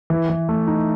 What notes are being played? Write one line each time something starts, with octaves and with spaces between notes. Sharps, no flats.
E3
E3
A3
D#4